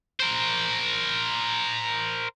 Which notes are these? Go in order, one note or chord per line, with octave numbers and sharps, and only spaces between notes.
A#4 C5